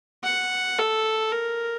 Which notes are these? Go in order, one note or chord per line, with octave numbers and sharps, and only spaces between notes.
F#5
A4
A#4